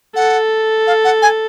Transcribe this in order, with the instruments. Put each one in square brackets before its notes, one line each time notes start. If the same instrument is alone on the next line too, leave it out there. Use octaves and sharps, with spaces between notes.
[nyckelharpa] A4 [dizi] F#5
[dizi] F5
F#5
G#5